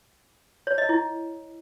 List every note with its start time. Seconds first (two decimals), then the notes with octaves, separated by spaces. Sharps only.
0.67 C#5
0.78 D#5
0.89 E4